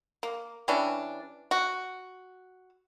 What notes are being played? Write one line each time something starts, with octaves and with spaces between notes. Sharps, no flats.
A#3
E3 G3 C#4 D4
F#4